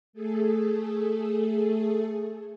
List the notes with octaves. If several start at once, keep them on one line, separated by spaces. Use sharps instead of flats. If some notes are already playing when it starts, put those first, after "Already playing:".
A3 G#4 A4